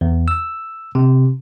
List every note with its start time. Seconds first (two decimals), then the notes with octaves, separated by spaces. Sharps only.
0.01 E2
0.28 E6
0.95 C3